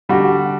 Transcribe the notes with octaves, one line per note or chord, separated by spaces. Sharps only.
D3 G3 D4 F#4